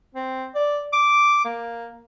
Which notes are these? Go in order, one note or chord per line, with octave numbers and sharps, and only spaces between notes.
C4
D5
D6
A#3